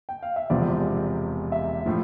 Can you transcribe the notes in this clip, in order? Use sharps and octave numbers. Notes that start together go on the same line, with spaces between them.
G5
F5
E5
E1 E2 C3 F3 C4 D5
E5
A2 F3